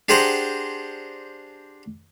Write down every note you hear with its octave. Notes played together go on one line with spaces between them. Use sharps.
D4 G4 G#4 C5 F#5 A#5